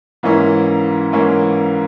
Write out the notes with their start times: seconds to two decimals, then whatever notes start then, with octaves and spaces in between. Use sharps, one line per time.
0.23 G#2 E3 A#3 C#4 E4
1.12 G#2 E3 A#3 C#4 E4